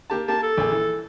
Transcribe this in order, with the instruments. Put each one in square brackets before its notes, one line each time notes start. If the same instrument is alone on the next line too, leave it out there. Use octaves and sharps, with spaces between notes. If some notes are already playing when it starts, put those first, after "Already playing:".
[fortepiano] A#3 G4 A5
[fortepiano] A#3 G4 [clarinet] A5
[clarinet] A4
[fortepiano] A#1 G#4
E3